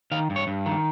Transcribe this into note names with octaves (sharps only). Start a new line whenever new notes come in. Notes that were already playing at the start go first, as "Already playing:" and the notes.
D#3 F5
G2
C#5
G2
D#3